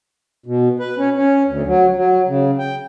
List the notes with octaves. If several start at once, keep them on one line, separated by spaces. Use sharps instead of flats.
B2
B4
C#4
C#4
D2
F#3
F#3
C#3
G5